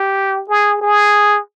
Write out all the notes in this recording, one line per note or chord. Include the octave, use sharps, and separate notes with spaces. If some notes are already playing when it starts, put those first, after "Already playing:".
Already playing: G4
G#4
G#4